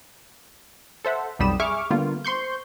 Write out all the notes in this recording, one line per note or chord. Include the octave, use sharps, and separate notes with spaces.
A4 C5 E5 F#5
B1 F2 G3 B5 D#6 E7
G#4 E5 C#6 D6 F6
D3 G3 A#3 B3 F4
C5 C6 C#6 G6